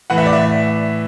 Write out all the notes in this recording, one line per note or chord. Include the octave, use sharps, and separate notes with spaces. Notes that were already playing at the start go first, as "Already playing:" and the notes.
A2 E3 F#5
E5
D5
E5